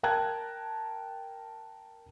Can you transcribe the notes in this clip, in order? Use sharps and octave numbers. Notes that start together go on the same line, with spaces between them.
A#4 G5 A5 A#5 F#6 G#6